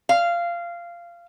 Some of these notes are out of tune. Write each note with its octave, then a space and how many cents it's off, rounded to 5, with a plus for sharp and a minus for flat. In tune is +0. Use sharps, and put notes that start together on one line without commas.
F5 -15